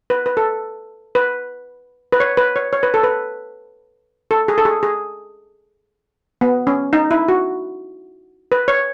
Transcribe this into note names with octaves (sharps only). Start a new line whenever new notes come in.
B4
B4
A4
B4
B4
C#5
B4
C#5
C#5
B4
A4
B4
A4
G#4
A4
G#4
G#4
B3
C#4
D#4
E4
F#4
B4
C#5